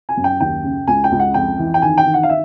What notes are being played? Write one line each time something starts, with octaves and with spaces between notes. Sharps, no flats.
G#5
F#2
G5
D#2 G5
C#3
C#2 G#5
G5
C#2
F#5
F2 G5
E3
G5
D#3 G#5
G5
D#3
F#5
F5
E5